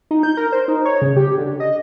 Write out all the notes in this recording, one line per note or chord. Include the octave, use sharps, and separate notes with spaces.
D#4
G6
A#4
C5
D#4
C#5
C#3
G4
D3
D#5